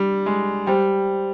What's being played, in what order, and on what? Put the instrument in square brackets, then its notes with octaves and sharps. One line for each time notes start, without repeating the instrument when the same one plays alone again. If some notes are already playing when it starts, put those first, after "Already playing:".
Already playing: [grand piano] G3 [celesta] D4
[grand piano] G#3
[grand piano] G3 [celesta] G4 C5 G5